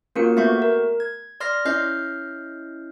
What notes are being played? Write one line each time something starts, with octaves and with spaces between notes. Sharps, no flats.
A#3 C#4 F4 F#4 A#4 C#7
A3 B3 F#4 E5 C#6 G6
A#4
G#6
D5 C6 F6 A#6 C7
C#4 E4 D#5 F6 G6 C7